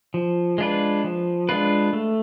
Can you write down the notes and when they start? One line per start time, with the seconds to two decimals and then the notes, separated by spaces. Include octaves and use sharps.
0.14 F3
0.58 G#3 D4 F4 B4
1.04 F3
1.49 G#3 D4 F4 B4
1.93 A3